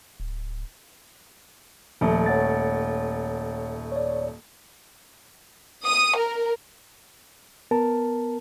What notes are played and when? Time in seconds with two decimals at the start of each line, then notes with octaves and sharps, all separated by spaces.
0.20 D1
2.01 D#1 F3 A3
2.26 C#5 F#5 A6
3.92 C#5 D5
5.84 D#6
6.17 A#4
7.71 B3 A#4 A5